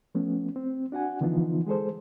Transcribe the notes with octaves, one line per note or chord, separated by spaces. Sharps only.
F3 A3 B3 C#4
C4
D4 F#4 F#5 G#5
D3 E3 F3 B3 D#4 F4
G#3 G#4 A4 C5